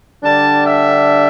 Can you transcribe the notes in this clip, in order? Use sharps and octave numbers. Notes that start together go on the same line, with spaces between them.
D3 G3 D4 A5
E5